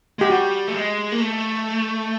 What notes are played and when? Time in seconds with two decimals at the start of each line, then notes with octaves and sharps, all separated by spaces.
0.19 G#3 G4
0.30 G3 F#4
0.67 A3
0.75 G#3
1.12 A#3
1.20 A3